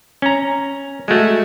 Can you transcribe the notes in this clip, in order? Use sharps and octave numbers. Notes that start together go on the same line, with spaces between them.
C#4 A#5
G#3 A3 F#4